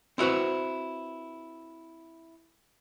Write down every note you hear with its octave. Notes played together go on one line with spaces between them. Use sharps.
C4 E4 F#4 B4 C5